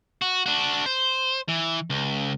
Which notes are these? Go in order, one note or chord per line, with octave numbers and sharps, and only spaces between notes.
F#4
D4 F#4
C5
E3
C#2